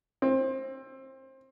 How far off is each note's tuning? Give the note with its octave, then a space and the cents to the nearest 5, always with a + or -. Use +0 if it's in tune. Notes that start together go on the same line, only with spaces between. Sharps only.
C4 +25